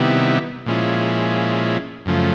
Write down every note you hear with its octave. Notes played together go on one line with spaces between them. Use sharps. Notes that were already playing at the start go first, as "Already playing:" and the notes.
Already playing: C3 D#3 G3 B3 E4
A#2 F3 G#3 C#4 E4
F#2 C#3 F3 A3